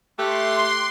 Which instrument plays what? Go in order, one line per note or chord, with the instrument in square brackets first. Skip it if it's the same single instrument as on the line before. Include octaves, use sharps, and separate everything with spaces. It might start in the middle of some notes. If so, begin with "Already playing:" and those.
[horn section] A3 [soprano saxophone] G4 [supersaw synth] C6 [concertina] D6 F#6